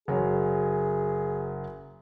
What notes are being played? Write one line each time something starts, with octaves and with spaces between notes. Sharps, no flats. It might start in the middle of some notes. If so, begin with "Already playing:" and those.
F#1 F#3 G#4 C#5